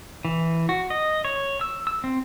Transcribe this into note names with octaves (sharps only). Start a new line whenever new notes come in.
E3
F#4
D#5
C#5
E6
E6
C4